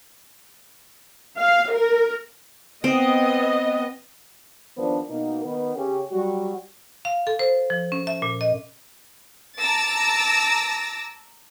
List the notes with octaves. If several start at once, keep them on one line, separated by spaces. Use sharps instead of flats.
F5
A#4
B3 C4 D#5
D#2 F3 B3 D4 A#4 C5
B2 A#3 D#4
D#3 B3 B4
C#3 C#4 G4
F#3 G3 F#4
F5
A4
C5
F3
C#4
E5
A#2
D#5
A5 A#5 D6 E6 A6 A#6